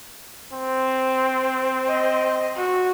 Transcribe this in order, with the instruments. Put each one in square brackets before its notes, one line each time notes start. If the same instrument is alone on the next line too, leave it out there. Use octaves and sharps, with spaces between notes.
[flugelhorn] C4
[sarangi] D#5
F#4